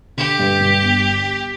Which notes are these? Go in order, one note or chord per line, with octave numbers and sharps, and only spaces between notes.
D3 G4
G2
G2
G1